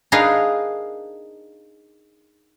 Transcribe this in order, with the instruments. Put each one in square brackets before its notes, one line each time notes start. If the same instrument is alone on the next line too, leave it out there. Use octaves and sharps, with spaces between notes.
[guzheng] D4 D#4 G#4 A#4 B4 F5